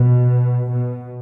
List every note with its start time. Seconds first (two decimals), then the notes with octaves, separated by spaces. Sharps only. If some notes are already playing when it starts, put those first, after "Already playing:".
Already playing: B2
0.69 B2